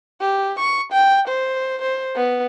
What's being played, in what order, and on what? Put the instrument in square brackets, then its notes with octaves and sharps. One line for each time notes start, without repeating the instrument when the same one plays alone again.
[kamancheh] G4
C#6
G5
C5
C5
B3